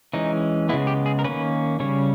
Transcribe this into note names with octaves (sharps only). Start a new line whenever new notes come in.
E3 G#3 C#4 D#4
C#3 G#3 B3 E4
G4
G#4
A#4
D#3 A#3 C#4 B4
C#3 G3 C#4 C#5